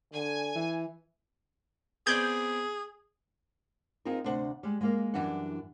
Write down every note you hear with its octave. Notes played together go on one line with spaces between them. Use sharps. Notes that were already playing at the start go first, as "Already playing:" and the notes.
D3 G#5
E3
B3 C4 G#4 D5 G6 G#6
C4 D#4 F4 G#4 A#4
D2 C3 D4 C5 F#5
G3 G#3
G#3 A#3 F5
F#2 E3 G3 D4 F#5